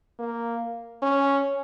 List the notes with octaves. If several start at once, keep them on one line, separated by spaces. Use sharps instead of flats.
A#3
C#4